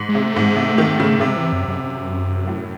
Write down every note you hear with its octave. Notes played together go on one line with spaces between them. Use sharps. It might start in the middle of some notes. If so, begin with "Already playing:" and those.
Already playing: G#2
G#3
C3
A3
G#2
G#3
C3 A3
D#3
C#3
C3 G#3
E3
F#2
F#2
F#2
A2